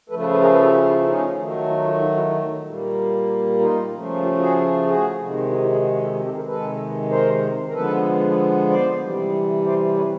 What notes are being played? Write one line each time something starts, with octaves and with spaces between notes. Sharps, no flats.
C#3 F3 A3 A4 B4
A4 B4
A4 B4
G#4 A#4
A4 B4
G4 A4
F#4 G#4
E4 F#4
C#4 D#4
D#3 F#3 A3
D#4 F4
D#4 F4
D#4 F4
E4 F#4
A#2 G3 A#3
D#4 F4
C#3 F3 A3
F4 G4
F#4 G#4
F#4 G#4
C3 D#3 G#3
E4 F#4
F4 G4
F#4 G#4
F#4 G#4
F#4 G#4
G4 A4
F4 G4
G4 A4
G#4 A#4
C3 D#3 G#3 A4 B4
A#4 C5
A#4
D3 F3 G#3 B3 A4 B4
C5 D5
C3 E3 G3
C5 D5
B4 C#5